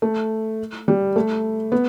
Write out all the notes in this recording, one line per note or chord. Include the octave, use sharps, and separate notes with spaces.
A3
G3
A3
B3